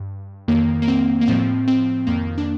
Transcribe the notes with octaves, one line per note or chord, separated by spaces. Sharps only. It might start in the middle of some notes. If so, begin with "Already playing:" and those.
Already playing: G2
F2 D#3 A#3
A#3
C4
A#3
A2 F3 C4
C4
F2 D#3 A#3
D4